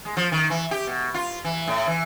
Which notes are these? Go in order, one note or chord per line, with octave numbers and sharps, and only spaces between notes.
G#3
F3
D#3
E3
G4
B2
F4
E3
A2
E3